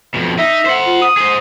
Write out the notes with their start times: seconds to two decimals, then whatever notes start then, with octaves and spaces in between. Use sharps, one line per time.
0.14 F2 B2
0.38 D#4 E5
0.66 C5 F#5
0.87 F4
1.02 D#6
1.17 G#4 C5